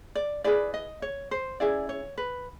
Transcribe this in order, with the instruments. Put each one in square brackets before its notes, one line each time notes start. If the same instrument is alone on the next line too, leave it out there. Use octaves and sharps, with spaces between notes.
[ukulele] D5
E4 G#4 B4 D5
D#5
C#5
C5
C#4 E4 G#4 D5
C#5
B4